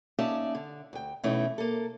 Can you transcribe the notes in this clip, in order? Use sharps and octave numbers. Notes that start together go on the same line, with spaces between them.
A#3 C#4 D#4 D5 E5 A5
D3
D2 G5
B2 E3 A3 C#4 D#4 E4
A#3 A4